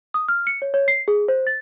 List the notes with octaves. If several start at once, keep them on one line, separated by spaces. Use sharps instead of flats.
D#6
F6
C#7
C#5
C#5
C7
G#4
C5
A6